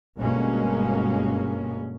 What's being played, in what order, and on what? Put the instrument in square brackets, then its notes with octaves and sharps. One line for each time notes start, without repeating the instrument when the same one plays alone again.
[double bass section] G1 B2 G#3 A#3 C#4